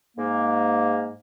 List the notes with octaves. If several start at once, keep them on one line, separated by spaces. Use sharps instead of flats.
G#2 A#3